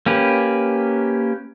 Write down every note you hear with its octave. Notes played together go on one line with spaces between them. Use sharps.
A#3 C#4 G4 B4